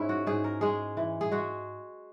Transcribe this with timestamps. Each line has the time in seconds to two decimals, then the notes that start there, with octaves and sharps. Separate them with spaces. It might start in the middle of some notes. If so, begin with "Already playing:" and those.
Already playing: G#2 C#4 E4
0.09 F#4
0.26 G#2 G#4
0.44 A#4
0.61 G#3 G#4
0.97 E3
1.21 G#4
1.31 G#3 F#4